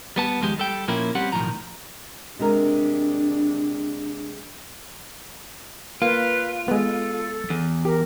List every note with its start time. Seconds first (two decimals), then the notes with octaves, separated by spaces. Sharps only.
0.16 G3 B3 A5
0.40 D#2 F3 G#3 G4
0.58 G3 A4 G5
0.88 A#2 F3 A#3 C#4 E4
1.15 G3 C4 C#4 G4 F#5
1.32 B1 A2 D#3 F3 A#5
2.39 C3 G#3 D4 A#4
6.02 A#3 F4 B4
6.68 G#3 B3 A4
7.50 E2
7.85 G4 A#4